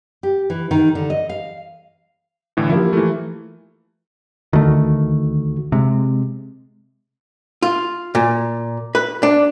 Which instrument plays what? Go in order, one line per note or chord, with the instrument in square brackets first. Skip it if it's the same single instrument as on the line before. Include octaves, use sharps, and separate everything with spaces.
[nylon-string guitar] G4
E3
D#3
D3
D#5
F5
[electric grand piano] A2 D3 E3
[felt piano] F3 A#3 G4 [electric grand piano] E4
[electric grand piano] E3 A3
[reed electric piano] D2 D3 F#4 [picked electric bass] D#3 A3
[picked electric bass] C3 [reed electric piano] G#3
[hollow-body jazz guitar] F4
A#2
B4
D4